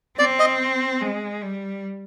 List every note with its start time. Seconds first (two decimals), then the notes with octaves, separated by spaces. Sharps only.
0.18 C4 D5
0.39 D#5
1.01 G#3
1.42 G3